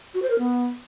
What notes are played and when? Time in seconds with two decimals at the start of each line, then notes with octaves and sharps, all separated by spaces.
0.14 F#4
0.22 C5
0.30 A#4
0.38 B3